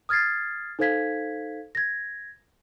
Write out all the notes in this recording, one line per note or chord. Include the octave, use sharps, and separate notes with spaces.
D#6 F6 G#6 A6 C7
D#4 A4 C5 F5 G#6 B6
G#6 A#6